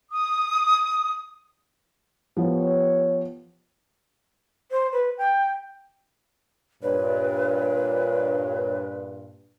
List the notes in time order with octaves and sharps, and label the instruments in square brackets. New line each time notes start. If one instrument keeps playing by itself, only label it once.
[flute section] D#6
[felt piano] F3 B3 [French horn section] G4 C#5
[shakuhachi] C5
B4
G5
[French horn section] G2 A#2 [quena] B4 [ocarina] C#5